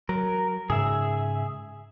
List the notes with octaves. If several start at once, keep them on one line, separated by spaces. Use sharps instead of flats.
F#3 A#4
G#2 C#3 G#4 E5